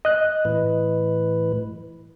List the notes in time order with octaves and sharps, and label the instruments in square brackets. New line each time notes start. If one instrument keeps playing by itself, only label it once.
[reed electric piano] D#5 F#6
[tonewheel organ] A2 E3 B4